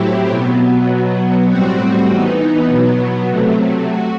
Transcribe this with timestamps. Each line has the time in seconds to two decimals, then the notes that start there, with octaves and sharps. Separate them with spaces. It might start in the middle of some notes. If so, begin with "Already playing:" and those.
Already playing: A2 F#3 C4 E4 G4
0.29 B2 F#3 B3
0.89 B2 F#3 B3
1.49 A2 G3 C4 F#4
2.09 E3 B3 D#4
2.69 B2 F#3 B3
3.29 C3 F#3 A3
3.88 F#4